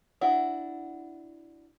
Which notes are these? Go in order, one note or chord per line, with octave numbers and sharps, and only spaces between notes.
D4 E4 F#4